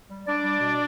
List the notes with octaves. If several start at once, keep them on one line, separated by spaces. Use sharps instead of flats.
G3
G3 D4 D5
G3
B2